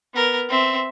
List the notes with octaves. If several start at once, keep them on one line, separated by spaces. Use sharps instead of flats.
B3 A#4
C4 E5